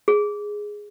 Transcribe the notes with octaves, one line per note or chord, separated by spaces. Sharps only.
G#4